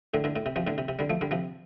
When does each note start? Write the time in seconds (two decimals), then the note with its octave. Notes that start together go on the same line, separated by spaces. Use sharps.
0.14 A2 D3
0.24 A2 D3
0.36 A2
0.46 C3
0.56 C3 F3
0.67 A2 D3
0.78 C3
0.88 C3
0.99 D3 G3
1.10 F3 A3
1.21 D3 G3
1.31 C3 F3